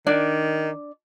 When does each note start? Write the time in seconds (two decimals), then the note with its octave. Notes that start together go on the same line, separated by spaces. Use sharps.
0.07 D#3 D4 D5